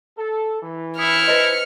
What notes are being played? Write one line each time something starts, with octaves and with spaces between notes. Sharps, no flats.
A4
E3
E4 D#6 F6 C#7
B4 C5 D#5